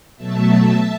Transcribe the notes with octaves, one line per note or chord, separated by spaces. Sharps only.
B2 F#3 A3 E5 A5